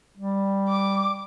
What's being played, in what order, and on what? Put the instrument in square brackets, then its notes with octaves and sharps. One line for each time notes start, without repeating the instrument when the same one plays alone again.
[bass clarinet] G3
[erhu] D6